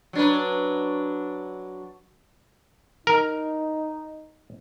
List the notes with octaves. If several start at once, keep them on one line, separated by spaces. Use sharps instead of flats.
F#3 D4 B4
D#4 A#4